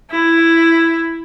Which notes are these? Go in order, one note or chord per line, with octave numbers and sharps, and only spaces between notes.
E4